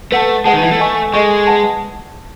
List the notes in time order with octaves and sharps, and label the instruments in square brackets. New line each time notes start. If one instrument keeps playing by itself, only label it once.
[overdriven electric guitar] A3 [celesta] B4 F#5 A5
[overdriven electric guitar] G#3 [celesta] B4 F#5 A5
[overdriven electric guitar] D#3
E3
A3
[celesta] A4 D#5 G#5 C#6
[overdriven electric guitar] G#3 [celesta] A4 D#5 G#5 C#6
[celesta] B4 F#5 A5